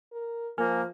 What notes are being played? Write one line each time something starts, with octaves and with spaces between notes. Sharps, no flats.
A#4
F3 A#3 A#4 G#5 F6